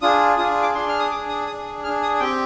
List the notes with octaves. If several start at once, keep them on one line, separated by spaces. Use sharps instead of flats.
D4 F4 G#4 D#6
D4 F4 G#4 D#6
D6
D4 G#4 C6
F6
D#6
D4 G#4 D6
D#6
D4 G#4 D#6
D4 G#4 F6
D#6
C4 G4 G5